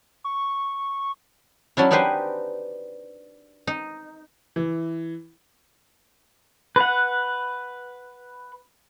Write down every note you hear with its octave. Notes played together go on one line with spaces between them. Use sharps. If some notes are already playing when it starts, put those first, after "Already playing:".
C#6
F#3 C#4 D4 E4
D4 D#4 G4 B4 C5 G#5
D#4
E3
B4 F#5